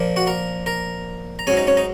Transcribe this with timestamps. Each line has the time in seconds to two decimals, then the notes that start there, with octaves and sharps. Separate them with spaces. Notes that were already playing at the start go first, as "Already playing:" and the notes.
Already playing: A#2 F3 A#3
0.16 F#4 F#5
0.27 A#4 A#5
0.66 A#4 A#5
1.39 A#5
1.47 G#2 F#3 C#4 G#4 G#5
1.57 D#4 D#5
1.67 C#4 C#5
1.77 D#4 D#5